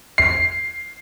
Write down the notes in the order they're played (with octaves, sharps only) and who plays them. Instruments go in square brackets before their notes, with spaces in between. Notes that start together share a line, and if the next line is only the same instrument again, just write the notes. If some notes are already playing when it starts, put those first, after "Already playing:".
[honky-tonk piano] C7